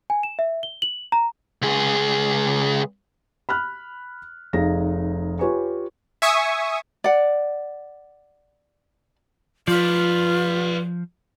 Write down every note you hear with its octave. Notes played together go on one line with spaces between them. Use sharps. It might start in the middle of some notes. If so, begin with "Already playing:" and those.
G#5
E7
E5
G7
F#7
A#5
C#2 G#4
B5 F6 F#6
F1 D#4 G#4 F5 A#6
F4 G4 B4 C#5 G#5 C#6
E5 G#5 C#6 D#6
D5 F#5
F3 F4 B4 D5